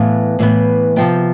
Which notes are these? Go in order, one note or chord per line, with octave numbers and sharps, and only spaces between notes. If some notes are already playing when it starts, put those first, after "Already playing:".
Already playing: A2 E3 B3 F5
A2 E3 B3
C3 F3 B3 G5